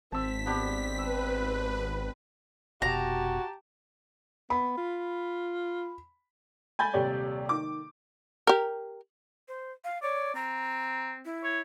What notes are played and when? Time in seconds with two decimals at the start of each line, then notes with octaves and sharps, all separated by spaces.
0.12 G#1 C4 A5 E6 B6
0.46 B3 C4 D4 G4
0.98 B4 E6
2.82 F1 B2 F#4 G4 A5 A#5
4.50 B3 B5
4.77 F4
6.79 G#5 B5 G6 A6
6.93 D#1 C3 G4 C#5 D5
7.49 D#3 D6
8.47 G4 A#4
9.48 C5
9.84 F5
10.03 C#5 D5
10.35 C4 A#5
11.25 E4
11.44 C#5